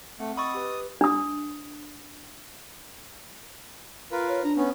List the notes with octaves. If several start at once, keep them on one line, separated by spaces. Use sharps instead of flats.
A3 C4 F#5
D#5 B5 C#6 D#6 E6 A6
G4 B4
D4 D#6
F4 A#4 B4
C#5
D4 A#5
B3 C#4